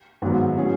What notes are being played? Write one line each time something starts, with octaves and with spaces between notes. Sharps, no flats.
G#1 G#2 F#3 B3
A2 F#3 C#4 G#4